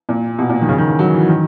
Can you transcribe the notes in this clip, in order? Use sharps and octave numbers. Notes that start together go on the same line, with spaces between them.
A#2
B2
A#2
D#3
C#3
D#3
E3
F#3
E3
D#3